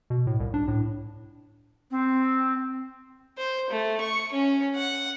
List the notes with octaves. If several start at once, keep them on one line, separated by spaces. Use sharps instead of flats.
B2
A2
C2
D4
A2
C4
C5
A3
C#6
C#4
F#5